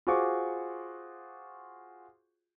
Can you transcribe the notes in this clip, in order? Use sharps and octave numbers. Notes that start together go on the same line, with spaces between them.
F4 F#4 G#4 C5 C#6 D6